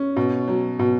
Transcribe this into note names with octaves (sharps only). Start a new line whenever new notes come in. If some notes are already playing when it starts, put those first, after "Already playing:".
Already playing: C#4
B2
F#3
B2